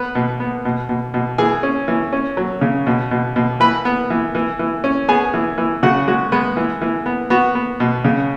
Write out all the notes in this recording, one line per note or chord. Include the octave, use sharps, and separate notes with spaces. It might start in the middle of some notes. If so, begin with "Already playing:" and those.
Already playing: B3 B4
B2
B3
B2
B2
B2
E3 G#4 G#5
C#4
E3
C#4
F#3
C#3
B2
B2
B2
E3 B4 B5
B3
E3
E3
E3
C#4
B3 G#4 G#5
E3
E3
C#3 F#4 F#5
G#3 F#4
G#3 B3 B4
E3
E3
B3
B3 F#4
B3
B2
C#3